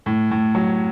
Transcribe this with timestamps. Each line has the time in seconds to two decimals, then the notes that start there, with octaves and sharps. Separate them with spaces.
0.06 A2
0.31 A2
0.55 F#3